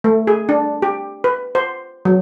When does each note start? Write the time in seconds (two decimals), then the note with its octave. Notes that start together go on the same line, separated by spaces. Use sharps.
0.04 A3
0.27 G#4
0.49 D4
0.82 G4
1.24 B4
1.55 C5
2.05 F#3